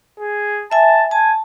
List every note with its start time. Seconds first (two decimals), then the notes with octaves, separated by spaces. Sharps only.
0.20 G#4
0.72 E5 G#5 A5
1.11 G#5 A5